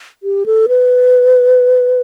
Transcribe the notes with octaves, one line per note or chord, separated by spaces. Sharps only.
G4
A4
B4